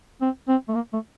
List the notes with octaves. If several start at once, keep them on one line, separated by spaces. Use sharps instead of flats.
C4
C4
A3
A#3
A3